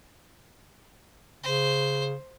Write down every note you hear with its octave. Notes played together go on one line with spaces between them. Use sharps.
C#3 C5